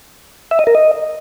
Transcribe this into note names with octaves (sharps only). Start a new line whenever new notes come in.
E5
D#5
A#4
D#5